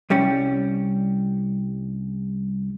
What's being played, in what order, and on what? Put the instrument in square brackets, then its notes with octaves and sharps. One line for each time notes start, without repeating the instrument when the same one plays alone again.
[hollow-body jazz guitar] C2 G3 C#4